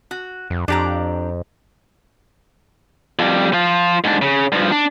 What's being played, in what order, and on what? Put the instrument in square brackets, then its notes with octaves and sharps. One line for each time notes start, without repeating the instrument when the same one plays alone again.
[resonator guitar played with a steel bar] F#4
[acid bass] F2
[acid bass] F2 [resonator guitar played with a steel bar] D4 G4 A#5
[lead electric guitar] F2 G3
F3 F4
G#2 D4
C#3
G2 F3
D4